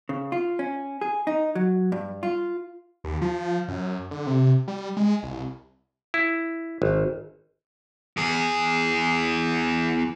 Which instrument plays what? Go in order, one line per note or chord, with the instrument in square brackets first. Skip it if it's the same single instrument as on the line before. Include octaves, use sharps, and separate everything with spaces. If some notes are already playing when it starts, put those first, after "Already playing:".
[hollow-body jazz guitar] C#3
F4
C#4
G#4
D#4
F#3
G2
F4
[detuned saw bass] D#2
F3
F#2
D3
C3
G3
G#3
C2
[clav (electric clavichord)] E4
G#1
[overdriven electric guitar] E2 G#4